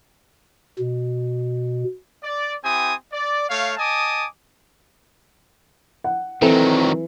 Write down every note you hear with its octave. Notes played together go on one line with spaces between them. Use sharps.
B2
D5
C4 E4 G4 G#5 D#6
D5
A3 C#5 F5
D#5 G#5 A5 D6 D#6
F#5
D#3 E3 F#3 C4 A4